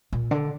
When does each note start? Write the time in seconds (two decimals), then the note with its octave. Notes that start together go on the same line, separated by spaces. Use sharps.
0.13 A#2
0.31 D3